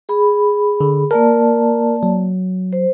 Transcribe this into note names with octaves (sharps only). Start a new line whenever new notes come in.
G#4 B5
D3
A#3 A#4 D5 A5
F#3
C5